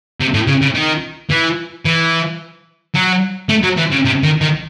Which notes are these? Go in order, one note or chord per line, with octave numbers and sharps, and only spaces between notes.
C3
A2
C#3
C#3
D#3
E3
E3
F#3
A3
F#3
E3
C#3
C3
D#3
D#3